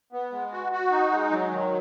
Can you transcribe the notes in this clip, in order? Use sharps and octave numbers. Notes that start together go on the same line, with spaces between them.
B3
G#3
F#4
F#4
D#4
G#3
F#3
D#3